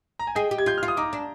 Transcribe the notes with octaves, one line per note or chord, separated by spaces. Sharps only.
A#5
G#5
G#4 D#5 G5
G4
G#6
F4 G6
F6
F4
D#6
D#4 A#5 D6
D4